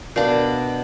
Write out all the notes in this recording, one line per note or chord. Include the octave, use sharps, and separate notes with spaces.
B2 D4 A#4 D5 F5